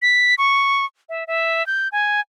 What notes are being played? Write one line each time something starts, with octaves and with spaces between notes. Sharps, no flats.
B6
C#6
E5
E5
G6
G#5